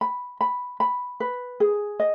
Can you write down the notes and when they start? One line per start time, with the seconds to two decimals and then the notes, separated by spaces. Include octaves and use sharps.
0.01 B5
0.41 B5
0.80 B5
1.20 B4
1.60 G#4
2.00 D#5